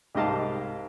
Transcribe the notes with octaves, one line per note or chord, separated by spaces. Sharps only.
C2 G#2 G4 D#5 F5 A5